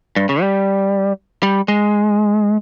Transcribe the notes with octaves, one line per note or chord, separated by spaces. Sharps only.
G2
C#3
G3
G3
G#3